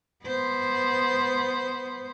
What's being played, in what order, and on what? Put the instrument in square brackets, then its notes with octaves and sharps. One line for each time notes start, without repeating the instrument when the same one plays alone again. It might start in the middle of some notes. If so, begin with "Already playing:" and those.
[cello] B3 C5